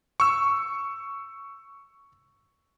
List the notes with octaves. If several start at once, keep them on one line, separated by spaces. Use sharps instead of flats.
C#6 E6